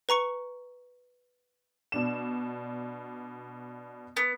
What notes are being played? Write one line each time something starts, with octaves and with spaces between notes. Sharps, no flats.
B4 A#5 C#6 C#7
B2 D4 E7
B3